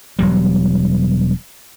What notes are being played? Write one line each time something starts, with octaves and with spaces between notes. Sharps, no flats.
E1 F#3 G3